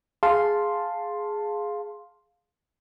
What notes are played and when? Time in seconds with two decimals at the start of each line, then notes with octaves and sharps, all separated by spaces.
0.23 G#4 F5 A5 C6